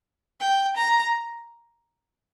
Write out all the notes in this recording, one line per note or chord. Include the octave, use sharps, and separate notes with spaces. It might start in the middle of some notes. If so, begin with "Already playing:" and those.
G5
A#5